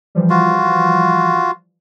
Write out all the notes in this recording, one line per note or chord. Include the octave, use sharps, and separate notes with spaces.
E3 F3 G3
F4 F#4